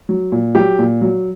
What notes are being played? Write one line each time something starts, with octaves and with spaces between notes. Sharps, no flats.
F#3
A#2
F#3 G4
A#2
F#3